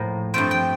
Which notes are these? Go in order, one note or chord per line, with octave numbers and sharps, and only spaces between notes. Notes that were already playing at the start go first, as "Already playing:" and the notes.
Already playing: A2 F3 A#3
G2 F3 A3 C4 G5
G5